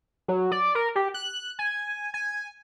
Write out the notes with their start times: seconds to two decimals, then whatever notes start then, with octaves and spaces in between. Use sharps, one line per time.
0.28 F#3
0.52 D5
0.75 A#4
0.95 G4
1.14 F#6
1.59 G#5
2.14 G#5